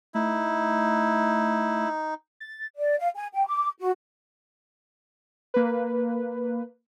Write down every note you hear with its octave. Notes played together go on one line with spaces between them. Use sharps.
A3 D#4 E4
A6
D5
F5
G#5
G5
D6
F#4
A#3 B4